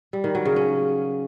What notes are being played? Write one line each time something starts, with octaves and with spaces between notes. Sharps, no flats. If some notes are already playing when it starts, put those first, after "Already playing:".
G3
D#3
F#3
C#3
C#4